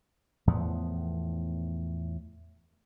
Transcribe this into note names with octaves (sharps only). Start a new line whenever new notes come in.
E2 A2 F3 B3